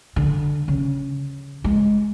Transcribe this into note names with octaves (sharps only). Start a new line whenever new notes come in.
D3
C#3
G#3